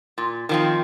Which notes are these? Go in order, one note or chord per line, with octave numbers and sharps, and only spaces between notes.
A#2
D#3 F3 C4